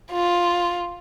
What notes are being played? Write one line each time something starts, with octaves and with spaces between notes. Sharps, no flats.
F4